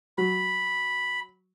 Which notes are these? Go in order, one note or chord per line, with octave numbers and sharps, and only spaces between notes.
F#3 B5